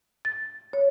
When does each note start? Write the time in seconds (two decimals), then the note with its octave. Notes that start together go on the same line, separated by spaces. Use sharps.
0.25 A6
0.73 C#5